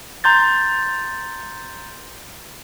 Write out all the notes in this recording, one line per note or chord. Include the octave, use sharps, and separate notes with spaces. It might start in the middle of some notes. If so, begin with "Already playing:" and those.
A#5 C6 G6 A6